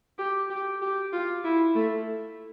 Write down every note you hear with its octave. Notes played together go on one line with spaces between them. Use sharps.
G4
G4
G4
F4
E4
A3